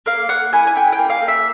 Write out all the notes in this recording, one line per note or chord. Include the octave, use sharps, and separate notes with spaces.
A#3 F5
A#3 F#5
E4 G#5
G#5
E4 G5
G5
A#3
F5
A#3
E5